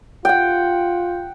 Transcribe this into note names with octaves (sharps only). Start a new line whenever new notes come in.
F4 F#5 G5